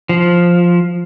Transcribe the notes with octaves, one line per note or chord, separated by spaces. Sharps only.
F3